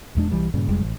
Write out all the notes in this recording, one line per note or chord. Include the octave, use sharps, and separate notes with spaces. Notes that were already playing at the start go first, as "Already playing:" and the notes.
D#1 E2 G#3 D4
B1 E3 G3
G2 A#2 C#3
F1 F2 G3 G#3
A1